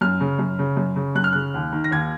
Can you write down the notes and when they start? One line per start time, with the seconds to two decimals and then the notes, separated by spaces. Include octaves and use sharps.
0.01 F#2 F6
0.20 C#3
0.39 F#2
0.59 C#3
0.77 F#2
0.96 C#3
1.15 F#2 F#6
1.24 F6
1.33 C#3 F#6
1.54 D#2
1.72 D#3
1.84 A#6
1.91 D#2 G#6